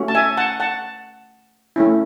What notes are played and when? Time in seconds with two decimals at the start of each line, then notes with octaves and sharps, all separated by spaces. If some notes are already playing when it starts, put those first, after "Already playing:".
Already playing: A3 C#4 F#4
0.08 A5
0.15 E5 G#5
0.37 F#5 A5
0.60 F#5 A5
1.76 A3 C#4 E4